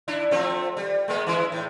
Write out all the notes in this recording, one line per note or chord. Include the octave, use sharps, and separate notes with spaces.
D4 E4
F3 A3 C4
G3
G#3 A#3 B3
E3 G#3 E4
A2